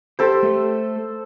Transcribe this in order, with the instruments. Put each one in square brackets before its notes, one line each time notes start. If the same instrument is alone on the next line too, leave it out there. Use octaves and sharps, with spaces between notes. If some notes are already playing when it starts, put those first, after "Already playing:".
[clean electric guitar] G4 [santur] A4 C5
[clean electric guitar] A3